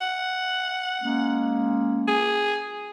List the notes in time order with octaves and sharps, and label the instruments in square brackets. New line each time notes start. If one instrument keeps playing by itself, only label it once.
[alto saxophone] F#5
[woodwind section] G#3 A#3 C#4
[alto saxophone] G#4